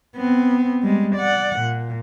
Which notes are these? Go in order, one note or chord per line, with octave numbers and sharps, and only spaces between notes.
B3 C4
G3 G#3
D5 F#5
A#2